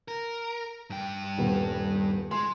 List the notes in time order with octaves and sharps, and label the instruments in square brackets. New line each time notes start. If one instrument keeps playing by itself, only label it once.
[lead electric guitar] A#4
G2 G5
[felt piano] D#1 B3
[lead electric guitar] G#3 [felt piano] C6